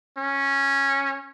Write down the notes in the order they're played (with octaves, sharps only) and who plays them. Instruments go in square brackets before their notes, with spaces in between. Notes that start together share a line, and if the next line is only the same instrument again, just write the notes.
[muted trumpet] C#4